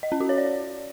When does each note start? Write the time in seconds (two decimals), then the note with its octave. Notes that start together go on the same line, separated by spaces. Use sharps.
0.03 D#5
0.12 C#4
0.20 F#4
0.29 C#5
0.38 D5